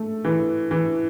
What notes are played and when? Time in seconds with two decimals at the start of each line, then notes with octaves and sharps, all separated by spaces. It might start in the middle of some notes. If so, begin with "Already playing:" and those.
Already playing: A3
0.25 E3
0.71 E3